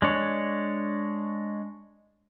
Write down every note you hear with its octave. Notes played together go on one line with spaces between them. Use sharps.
G#3 D4 C#5